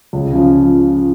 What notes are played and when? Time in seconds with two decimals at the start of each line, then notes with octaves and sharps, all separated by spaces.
0.13 C#2
0.32 C#3 F3